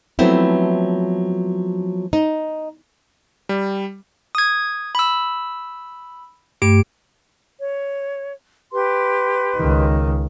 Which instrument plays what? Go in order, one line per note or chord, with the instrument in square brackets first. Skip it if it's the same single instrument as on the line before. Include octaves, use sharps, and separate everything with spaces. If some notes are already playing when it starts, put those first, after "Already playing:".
[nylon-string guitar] F3 F#3 A3 B3 C4 E4
D#4
[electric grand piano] G3
[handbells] D#6 G#6
B5 E6
[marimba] G2 A3 [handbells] G4 D7
[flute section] C#5
G4 B4 C6
[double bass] C#2 D#3